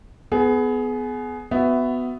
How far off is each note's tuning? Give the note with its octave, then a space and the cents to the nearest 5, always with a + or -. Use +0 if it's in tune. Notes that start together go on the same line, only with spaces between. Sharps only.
B3 +15 G#4 +25
B3 +15 F#4 +0 E5 +10